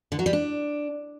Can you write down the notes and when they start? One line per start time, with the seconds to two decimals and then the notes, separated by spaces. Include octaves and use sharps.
0.12 D3
0.19 F#3
0.26 G3
0.33 D4